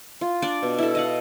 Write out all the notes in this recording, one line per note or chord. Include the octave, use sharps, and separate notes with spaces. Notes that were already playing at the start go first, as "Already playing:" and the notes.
F4
D4 D5
B2
E4 A4
D#5 F5 F#5